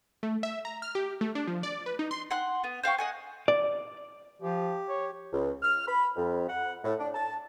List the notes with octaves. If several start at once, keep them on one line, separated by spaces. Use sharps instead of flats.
A3
E5
A#5
F6
G4
A3
D4
F3
D5
B4
D#4
C6
F#5 C6 F#6
B3
C5 F5 G5 C#6
D#5 F#5 G#5
D5
F3 G4
C#5
C#2
F6
B5
F2
F#5
A2
D4
A5